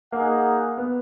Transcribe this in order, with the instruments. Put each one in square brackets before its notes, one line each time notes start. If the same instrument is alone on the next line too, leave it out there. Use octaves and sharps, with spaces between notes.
[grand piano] A#3 [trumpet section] D#4 G#4 D#5 F#5
[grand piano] B3